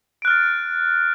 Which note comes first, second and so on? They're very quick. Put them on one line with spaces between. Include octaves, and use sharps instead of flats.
D7 F#6 F6 A6